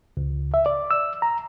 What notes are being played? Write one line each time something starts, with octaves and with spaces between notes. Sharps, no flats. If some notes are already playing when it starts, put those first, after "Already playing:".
C#2
E5
D5
E6
A#5